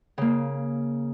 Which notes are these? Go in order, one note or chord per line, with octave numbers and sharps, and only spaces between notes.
C#3 A#3